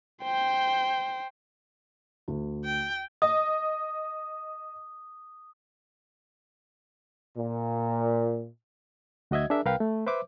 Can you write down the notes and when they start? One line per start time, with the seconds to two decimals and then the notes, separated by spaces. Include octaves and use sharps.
0.23 C5 G5
2.28 D2
2.64 G5
3.22 D#5 D#6
7.36 A#2
9.31 D2 F#4 D#5 E5 G#6
9.50 D4 G#4 A#4 E5
9.65 C2 A#4 B4 F5 G5
9.80 A3
10.06 B4 C5 E5 D6